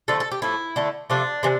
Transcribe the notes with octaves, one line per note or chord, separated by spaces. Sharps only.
D3 F3 A3 A4
A4
G4
A2 F3 A3 E4
D3 A3
C3 F3 A3 D4
C3 E3